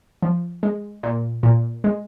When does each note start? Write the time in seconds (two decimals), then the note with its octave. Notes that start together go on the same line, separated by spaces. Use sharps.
0.22 F3
0.63 G#3
1.03 A#2
1.43 A#2
1.84 G#3